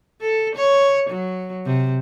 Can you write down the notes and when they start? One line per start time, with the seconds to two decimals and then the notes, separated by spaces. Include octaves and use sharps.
0.21 A4
0.55 C#5
1.10 F#3
1.66 C3